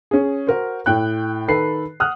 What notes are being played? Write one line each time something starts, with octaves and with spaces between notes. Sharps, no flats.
C#4 G#4
F#4 A#4 C5
A2 G5 F#6
D#3 A4 B4 C7
F#5 D#6 F6 F#6